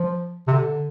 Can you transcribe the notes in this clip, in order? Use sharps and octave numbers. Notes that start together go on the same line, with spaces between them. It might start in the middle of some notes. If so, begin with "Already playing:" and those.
Already playing: F3
C3
D3